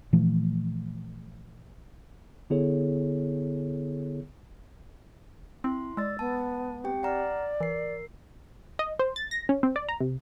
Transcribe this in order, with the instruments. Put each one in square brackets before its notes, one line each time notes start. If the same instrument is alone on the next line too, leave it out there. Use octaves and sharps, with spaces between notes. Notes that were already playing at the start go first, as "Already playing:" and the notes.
[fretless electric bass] A#2 E3 F3 A3
[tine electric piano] D3 B3 E4 G#4 A4 C#5
[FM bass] C4 [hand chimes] E4 C6
[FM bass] G#3 [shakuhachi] D5 [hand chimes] E6 A6
[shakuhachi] B3 [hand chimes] A5
[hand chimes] C4 G4 G5
[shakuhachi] D5 [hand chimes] F#5 A#5 F6
[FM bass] E3 [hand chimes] A#4 C7
[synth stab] D#5
C5
A6
A#6
C#4
C4
D5
A#5
C3